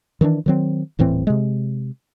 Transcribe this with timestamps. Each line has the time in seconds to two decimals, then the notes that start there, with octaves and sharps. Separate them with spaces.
0.21 D#3 E3 C4 D4
0.46 D#3 F#3 C4
0.99 D#1 A2 E3 C4
1.27 C3 G#3